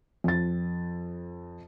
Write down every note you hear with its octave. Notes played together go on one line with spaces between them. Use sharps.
F2 A6